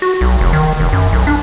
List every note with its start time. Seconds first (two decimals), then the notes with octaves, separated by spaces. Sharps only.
0.02 F#4
0.21 B1
0.41 F1
0.53 D#3
0.80 F1
0.93 F#2
1.13 B1
1.27 D4